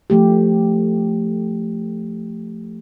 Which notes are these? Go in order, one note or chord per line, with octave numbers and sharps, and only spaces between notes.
F3 A3 G4